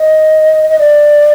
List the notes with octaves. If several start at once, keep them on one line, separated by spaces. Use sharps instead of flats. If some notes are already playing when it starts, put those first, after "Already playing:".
Already playing: D#5
D#5
D5